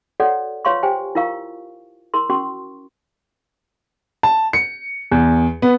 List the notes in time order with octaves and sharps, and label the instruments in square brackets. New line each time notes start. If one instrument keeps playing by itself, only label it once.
[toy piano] F#4 A4 B4 C#5 D5 F#5
F4 B4 C#5 F5 C6 C#6
G4 C5 G5 G#5
E4 F4 A#4 F5 C#6
E4 A#4 C6
C#4 F#4 A#4 C6 C#6
[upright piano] A5
C#7
E2
B3